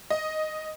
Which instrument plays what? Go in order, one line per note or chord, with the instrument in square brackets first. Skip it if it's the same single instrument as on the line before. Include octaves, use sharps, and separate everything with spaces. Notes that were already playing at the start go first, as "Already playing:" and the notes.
[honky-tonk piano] D#5